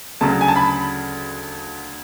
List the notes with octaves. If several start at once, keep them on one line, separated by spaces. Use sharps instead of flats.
D2 C#3 F#3 A5
G#5
A5
B5